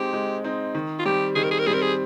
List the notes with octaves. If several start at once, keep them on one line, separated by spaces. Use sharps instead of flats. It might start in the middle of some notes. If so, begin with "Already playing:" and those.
Already playing: G#3 C4 D#4 G4
G#3
C4 D#4
D#3
F4
G3 C4 G4
D#3 G#4
A#4
G#4
A#4
G3 C4 G#4 A#4
G#4